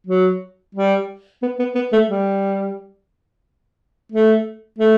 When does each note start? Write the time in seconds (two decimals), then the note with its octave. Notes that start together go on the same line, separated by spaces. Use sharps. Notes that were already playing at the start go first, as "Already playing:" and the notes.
0.07 F#3
0.75 G3
1.42 B3
1.59 B3
1.75 B3
1.93 A3
2.09 G3
4.12 A3
4.78 A3